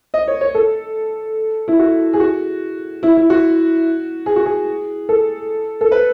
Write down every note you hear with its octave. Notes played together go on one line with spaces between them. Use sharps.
D#5
C#5
C#5
A4
E4
F#4
G#4
F#4
E4
E4
F#4
G#4
F#4
G#4
A4
A4
B4